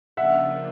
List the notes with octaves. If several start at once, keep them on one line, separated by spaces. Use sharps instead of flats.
C#3 F3 A#3 D4 F4 E5 F#5